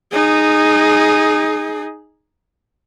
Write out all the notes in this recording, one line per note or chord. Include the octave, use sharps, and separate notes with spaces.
D#4 G#4